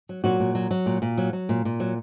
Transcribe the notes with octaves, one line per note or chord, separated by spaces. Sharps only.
F#3
A#2 F#3 F#4
A#2
F#3
F#3
A#2
A#2
F#3
F#3
A#2
A#2
F#3